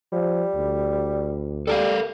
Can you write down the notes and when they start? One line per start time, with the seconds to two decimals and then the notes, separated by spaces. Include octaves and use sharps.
0.13 F3 G3
0.55 D2
1.67 G3 A4 A#4 F5